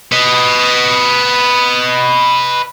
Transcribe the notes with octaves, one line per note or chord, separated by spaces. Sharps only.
B4 D#5